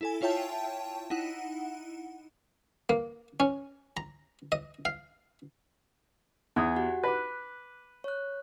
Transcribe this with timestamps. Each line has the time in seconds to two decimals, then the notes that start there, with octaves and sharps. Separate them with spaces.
0.01 E4 A4 G#5
0.21 E4 F4 C#5 E5 G5 A5
1.10 D#4 E4 F#5
2.89 A#3
3.40 C#4
3.97 A#5
4.52 D#5
4.85 F5
6.56 E2 F#5 G#5 D#6 G#6
6.76 F#4 G4 F#5
7.04 B4 D6 F#6
8.04 C#5 F#6